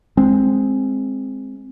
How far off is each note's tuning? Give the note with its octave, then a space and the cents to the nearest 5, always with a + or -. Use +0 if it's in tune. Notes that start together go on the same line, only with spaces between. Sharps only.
G#3 +0 C4 +10